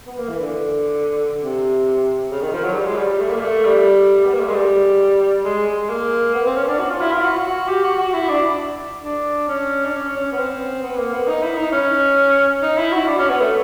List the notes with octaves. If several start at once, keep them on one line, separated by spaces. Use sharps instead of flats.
B3
A#3
E3
D3
C3
C#3
D#3
F3
F#3
G3
G#3
G3
A3
A#3
A3
G3
B3
A#3
A3
G#3
G3
G#3
G#3
A#3
B3
C4
C#4
D4
F#4
F4
E4
F4
F#4
F#4
G4
F#4
F#4
E4
D4
D4
C#4
D4
C#4
C#4
B3
C4
B3
A#3
B3
D#4
E4
D#4
C#4
D#4
E4
F#4
D4
C#4
B3
A3